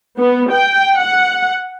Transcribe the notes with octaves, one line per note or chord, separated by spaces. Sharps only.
B3
G5
F#5